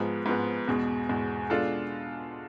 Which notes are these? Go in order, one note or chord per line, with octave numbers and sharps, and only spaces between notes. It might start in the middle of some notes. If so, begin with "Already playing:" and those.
Already playing: G#2 F3 G#3 B3
G#2 F3 G#3 B3
E2 B2 G#3
E2 B2 G#3
B2 G#3 D4 F4 A4